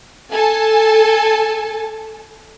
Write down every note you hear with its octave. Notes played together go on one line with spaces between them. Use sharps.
A4 G#5 A5